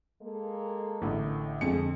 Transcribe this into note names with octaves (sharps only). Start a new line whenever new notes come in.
G#3 A#3 A4
A1 A2 D3
F2 D3 G#3 G#4 C#7